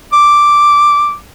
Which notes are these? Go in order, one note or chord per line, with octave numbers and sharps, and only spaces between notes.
D6